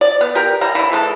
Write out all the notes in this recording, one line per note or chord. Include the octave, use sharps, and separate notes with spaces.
D5
B3
G4 A#4
E3 G3 A#5
E3 E4
E3 G#3 A4